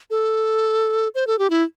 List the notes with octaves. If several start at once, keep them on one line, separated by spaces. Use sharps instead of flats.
A4
C5
A4
G4
E4